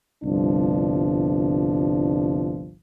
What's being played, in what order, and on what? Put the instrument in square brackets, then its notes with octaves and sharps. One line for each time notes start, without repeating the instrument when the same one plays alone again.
[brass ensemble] G1 C2 F3 D4